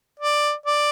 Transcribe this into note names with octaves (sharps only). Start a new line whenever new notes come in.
D5
D5